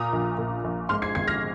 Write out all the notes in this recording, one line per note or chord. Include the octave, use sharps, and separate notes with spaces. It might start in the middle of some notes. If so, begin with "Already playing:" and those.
Already playing: A#2 A#5 D#6
A#1
A#2
A#1
G#2 C6 F6
G#6 C7
G#1 G#6 C7
F6 A#6